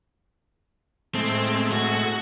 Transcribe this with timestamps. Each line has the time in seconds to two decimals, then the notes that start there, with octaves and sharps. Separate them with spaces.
1.14 A2 G#3 A3 C4
1.72 F#4